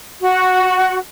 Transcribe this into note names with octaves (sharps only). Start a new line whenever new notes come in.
F#4